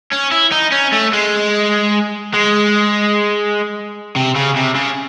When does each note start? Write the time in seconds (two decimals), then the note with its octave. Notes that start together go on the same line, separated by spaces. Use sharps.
0.12 C#4
0.31 E4
0.52 D#4
0.72 C#4
0.93 A3
1.13 G#3
2.34 G#3
4.16 C3
4.36 C#3
4.56 C3
4.75 C#3